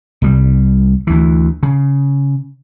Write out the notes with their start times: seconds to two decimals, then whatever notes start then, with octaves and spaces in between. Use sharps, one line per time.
0.22 C2 G3
1.07 D2 E3
1.63 C#3